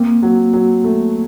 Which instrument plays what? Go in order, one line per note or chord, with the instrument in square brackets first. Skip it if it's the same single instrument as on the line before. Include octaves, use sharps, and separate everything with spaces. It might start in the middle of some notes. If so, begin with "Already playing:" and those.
Already playing: [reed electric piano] A#3 [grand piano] C4
[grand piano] F#3
F#3
A3